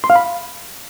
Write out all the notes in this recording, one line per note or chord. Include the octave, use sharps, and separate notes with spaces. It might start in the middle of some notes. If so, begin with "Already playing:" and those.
C6
F5
B5